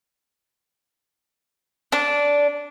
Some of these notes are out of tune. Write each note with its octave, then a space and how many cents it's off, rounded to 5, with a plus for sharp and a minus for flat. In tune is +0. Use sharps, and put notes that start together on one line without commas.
D4 -15